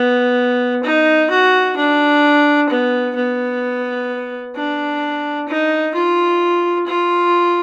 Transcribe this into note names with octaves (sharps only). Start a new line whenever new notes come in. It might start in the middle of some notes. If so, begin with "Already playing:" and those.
Already playing: B3
D#4
F#4
D4
B3
B3
D4
D#4
F4
F4